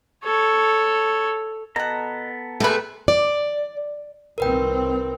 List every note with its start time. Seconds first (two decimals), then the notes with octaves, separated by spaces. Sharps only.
0.24 A4 C#5
1.76 B2 B3 A4 F#5 A#5
2.60 C3 G3 A3 G#4 B4
3.08 D5
4.38 C2 D#3 C4 A#4 B4 G5